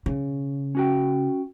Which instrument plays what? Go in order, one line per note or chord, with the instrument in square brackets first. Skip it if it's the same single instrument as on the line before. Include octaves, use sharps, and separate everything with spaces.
[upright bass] C#3
[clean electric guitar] C#4 F#4 G5